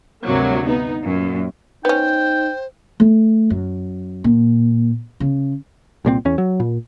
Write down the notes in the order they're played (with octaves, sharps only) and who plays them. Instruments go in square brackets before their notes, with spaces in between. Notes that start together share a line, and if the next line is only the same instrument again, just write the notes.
[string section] D2 G2 C3 F#3 A#3
B3 D#4
F#2 A#2
[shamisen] B3 C#4 [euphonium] D#4 [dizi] C5 [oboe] G5
[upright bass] A3
F#2
A#2
C#3
[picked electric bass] C2 A#2 F3 C4
E2 C#4
F#3
A#2